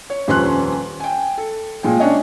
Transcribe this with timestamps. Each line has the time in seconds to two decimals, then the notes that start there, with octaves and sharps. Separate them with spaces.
0.10 C#5
0.28 D#1 F2 C#4 B4 C6 F#6
1.00 G5 G#5
1.37 A4
1.83 A#2 G#3 G5
2.00 C#4 D4 C#5 D#5